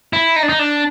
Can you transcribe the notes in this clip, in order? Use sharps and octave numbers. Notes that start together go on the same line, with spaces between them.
E4
D#4
D4
D#4
D4